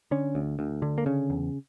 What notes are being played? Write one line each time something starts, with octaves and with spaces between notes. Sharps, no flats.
D3 C#4
D2
D2
D3
A#3
C#3 C#4
E2